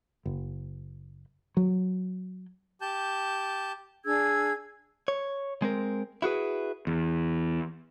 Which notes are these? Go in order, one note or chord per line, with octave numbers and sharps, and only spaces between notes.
F#1
F#3
G4 A5 G6
D4 G#4 E6 G#6
C#5
G#3 C4 A#4
E4 F#4 G#4 B4
E2